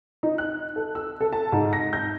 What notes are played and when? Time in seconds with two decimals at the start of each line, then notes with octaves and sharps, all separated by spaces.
0.23 D#4
0.38 F#6
0.76 A4
0.95 E6
1.21 A4
1.33 A5
1.52 G#2
1.73 A#6
1.93 G6